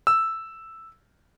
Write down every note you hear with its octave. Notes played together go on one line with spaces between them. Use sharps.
E6